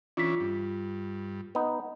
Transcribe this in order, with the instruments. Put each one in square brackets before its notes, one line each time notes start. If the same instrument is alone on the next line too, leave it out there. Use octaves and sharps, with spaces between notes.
[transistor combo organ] E3 C#4 D4 [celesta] F4 B6
[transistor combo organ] G2
[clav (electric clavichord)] B3 D#4